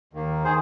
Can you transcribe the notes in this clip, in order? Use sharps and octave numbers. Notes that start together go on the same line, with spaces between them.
D#2 D#3 A#3
D#3 G#4 C5